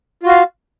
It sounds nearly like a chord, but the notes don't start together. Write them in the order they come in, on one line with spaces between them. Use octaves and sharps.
F4 F#4 F5